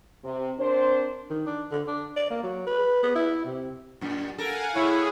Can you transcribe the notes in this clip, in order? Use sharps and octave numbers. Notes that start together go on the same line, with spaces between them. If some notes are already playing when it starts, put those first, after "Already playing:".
C3
C4 D4 A#4 C5
D#3
D4
D3
D4
D5
A#3
F#3
B4
B3
E4
C3
F#2 A#2
A4 A#4 F5 F#5 G#5
A2 E4 G#4 C#5 E5